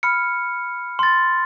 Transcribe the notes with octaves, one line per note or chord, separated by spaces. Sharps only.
B5 F6 C#7
C6 A6